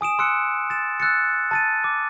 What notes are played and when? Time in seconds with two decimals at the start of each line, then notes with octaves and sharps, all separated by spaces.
0.01 G#5 D#6 D7 E7
0.19 C6 E6 F#6 C#7
0.70 A6 E7
1.00 E6 F#6 A6 C#7
1.51 A5 A6 D#7
1.84 D6